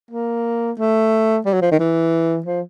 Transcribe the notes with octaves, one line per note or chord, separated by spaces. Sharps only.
A#3
A3
G3
F#3
F3
D#3
E3
F3